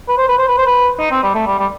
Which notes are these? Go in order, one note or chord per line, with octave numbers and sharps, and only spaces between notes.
B4
C5
B4
C5
B4
C5
B4
D#4
C4
G3
A3
G3
G3